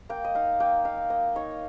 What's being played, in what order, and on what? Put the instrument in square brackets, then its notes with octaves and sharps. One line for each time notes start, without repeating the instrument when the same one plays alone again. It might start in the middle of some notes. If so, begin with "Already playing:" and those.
[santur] A#3 G5
D#5
D#4 F5
A#3 G5
D#4 F5
A#3 D#5
D#4 C#5